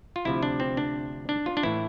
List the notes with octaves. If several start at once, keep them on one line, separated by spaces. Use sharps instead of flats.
F4
D2 C3 F3 E4
D4
C4
D4
D4
F4
D4
A2 E3 E4